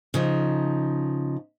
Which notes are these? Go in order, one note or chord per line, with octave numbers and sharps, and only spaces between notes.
C#3 F3 D#4